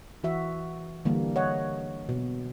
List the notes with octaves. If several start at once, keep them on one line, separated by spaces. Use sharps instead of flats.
E3 F#4 E5
D3 E3 G3 A#3
C#5 D#5 F#5
B2